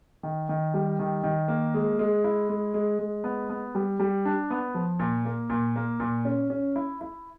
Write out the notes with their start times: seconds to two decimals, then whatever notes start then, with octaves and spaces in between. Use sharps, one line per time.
0.23 D#3
0.49 D#3
0.74 G3
0.99 D#3
1.23 D#3
1.48 A#3
1.74 G#3
1.99 G#3
2.24 E4
2.49 G#3
2.74 G#3
2.99 G#3
3.24 B3
3.50 B3
3.75 G3
4.00 G3
4.25 D4
4.50 B3
4.75 F3
4.99 A#2
5.25 A#3
5.50 A#2
5.76 A#3
6.00 A#2
6.25 C#4
6.50 C#4
6.76 E4
7.01 E4